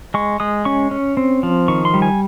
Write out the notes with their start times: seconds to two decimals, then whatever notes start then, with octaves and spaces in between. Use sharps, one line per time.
0.14 G#3 C#6
0.40 G#3 D#6
0.65 C#4 C#6
0.91 C#4
1.17 C4
1.43 F3
1.68 D#3 C#6
1.85 C6
1.94 G3
2.02 G#5